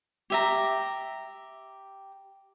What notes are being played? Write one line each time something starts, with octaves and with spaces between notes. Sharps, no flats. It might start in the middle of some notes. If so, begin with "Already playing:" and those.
G4 E5 A#5